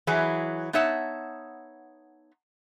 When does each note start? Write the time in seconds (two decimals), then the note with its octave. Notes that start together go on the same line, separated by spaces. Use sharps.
0.07 E3 F#3 E4 G#4
0.73 B3 D#4 C#5 E5 F#5 A5